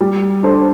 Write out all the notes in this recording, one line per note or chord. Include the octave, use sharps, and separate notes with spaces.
G3
D4 A4 C5